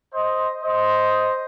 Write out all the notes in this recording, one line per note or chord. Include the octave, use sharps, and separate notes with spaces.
C5 D#5
C5 D#5